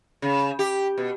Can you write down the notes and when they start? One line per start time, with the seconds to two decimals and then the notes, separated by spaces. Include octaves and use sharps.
0.22 C#3
0.59 G4
0.98 B2